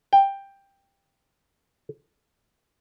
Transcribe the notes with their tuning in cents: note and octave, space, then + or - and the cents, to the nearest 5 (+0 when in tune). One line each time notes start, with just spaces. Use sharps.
G5 +10